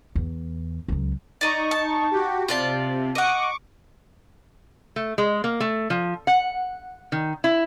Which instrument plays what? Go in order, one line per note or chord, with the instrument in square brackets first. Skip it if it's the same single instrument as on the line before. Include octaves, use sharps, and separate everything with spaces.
[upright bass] E2
C#2 F#3
[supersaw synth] D#4 C#6 [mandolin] D5 D#5 A#5
[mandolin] A5
[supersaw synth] F#4 G4
[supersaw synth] C3 [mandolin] F4 D5 A5
[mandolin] D#5 F#5 [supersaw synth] C#6 D6
[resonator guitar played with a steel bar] A3
G#3
A#3
A3
F3
F#5
D#3
E4